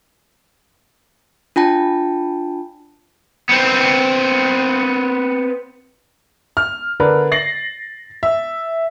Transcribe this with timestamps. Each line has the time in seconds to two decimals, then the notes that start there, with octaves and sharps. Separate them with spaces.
1.56 D4 F4 G5 A5
3.49 B3 C4
6.57 F6
7.00 D3 D4 A#4 B4
7.32 A6 A#6 C7 F#7
8.23 E5